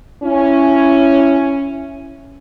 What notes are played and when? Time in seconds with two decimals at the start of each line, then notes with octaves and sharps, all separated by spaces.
0.23 C#4 E4